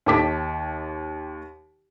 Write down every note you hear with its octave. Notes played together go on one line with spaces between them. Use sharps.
D#2 D#3 A5 D6 B6